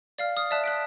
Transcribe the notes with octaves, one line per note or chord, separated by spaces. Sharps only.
D5 F5 F6
D#6 F6
D5 E5 A5 F#6
F#6 B6 D7